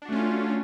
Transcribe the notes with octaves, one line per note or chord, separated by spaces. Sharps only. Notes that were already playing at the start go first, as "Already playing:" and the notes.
A3 C#4 D4 F4 F#4